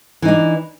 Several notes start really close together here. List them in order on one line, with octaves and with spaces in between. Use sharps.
E3 D#4 D4